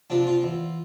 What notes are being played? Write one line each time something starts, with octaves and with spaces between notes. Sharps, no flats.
C3 F3 D4
F4
E2